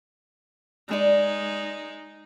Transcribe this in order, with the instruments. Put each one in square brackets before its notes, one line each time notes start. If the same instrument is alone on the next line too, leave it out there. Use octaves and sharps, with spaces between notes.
[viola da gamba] G#3 D#4 [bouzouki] D5 G#5 A#5